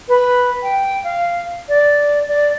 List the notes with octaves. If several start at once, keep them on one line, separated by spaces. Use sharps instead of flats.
B4
G5
F5
D5
D5